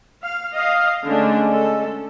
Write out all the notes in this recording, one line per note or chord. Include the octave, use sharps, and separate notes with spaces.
F5
D#5 F5
D3 G#3 A3 C#4 D4
A4